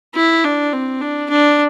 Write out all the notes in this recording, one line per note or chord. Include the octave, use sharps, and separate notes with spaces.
E4
D4
C4
D4
D4